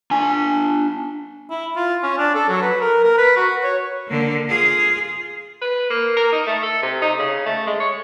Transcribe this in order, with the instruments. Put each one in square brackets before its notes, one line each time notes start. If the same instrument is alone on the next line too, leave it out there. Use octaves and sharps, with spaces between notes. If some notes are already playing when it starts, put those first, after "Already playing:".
[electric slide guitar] D4 G#5
[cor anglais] E4
F4
C#4
D4
A4
F#3
B4
A#4
A#4
B4
F#4
C#5
[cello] D3 A#3
F4 G#4
[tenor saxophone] B4
A#3
A#4
D#4
A3
A4
C3
D#4
C#3
A3
G#3
C#5